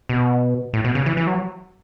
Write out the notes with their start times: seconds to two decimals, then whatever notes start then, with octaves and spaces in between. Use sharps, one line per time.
0.09 B2
0.73 A2
0.84 B2
0.95 C#3
1.06 E3
1.17 E3
1.27 F#3